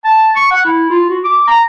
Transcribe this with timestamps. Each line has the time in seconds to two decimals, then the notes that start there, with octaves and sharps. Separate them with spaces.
0.04 A5
0.36 C#6
0.51 F#5
0.65 E4
0.90 F4
1.09 F#4
1.24 D6
1.47 A#5